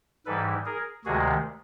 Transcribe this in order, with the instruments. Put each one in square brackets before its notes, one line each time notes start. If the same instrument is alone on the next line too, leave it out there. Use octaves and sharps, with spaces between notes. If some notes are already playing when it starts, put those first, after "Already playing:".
[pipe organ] G#2 E3 G3 A4 B4
G#4 A#4
D2 C3 D#3 G#3 F#4 G#4